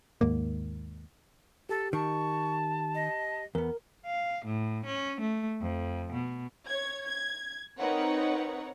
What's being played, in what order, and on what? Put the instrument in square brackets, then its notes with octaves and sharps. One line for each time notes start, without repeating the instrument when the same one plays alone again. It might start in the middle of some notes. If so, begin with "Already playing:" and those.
[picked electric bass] D#2 G#2 A#3
[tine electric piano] G4 [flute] A4
[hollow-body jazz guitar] D#3 [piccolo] A5 [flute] C#6
[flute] D#5
[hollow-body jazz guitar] E2 B3 [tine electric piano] A#4
[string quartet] F5
A2
C#4
A3
F2
B2
[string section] C#5 G#6
G#6
C4 D#4 A#4 B4 C#5 F#5